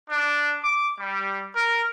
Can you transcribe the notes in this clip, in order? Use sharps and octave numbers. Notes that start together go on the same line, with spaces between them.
D4
D6
G3
A#4